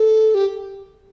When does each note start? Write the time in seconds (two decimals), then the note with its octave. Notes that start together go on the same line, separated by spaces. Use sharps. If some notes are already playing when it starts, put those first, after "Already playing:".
Already playing: A4
0.35 G4